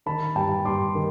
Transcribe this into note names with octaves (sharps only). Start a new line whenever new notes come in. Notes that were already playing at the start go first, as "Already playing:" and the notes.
D#3 A5 B5
G2 G5 A5
G2 C6 D6
D#3